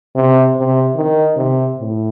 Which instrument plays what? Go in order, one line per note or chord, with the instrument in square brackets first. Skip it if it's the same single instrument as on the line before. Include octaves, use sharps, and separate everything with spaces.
[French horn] C3
C3
D#3
C3
A2